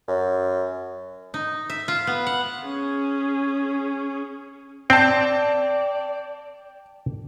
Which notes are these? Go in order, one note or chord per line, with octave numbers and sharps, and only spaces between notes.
F#2
D#4
E5
F4
B3
F#5
C#4 G#4
C4 D5 G5 A5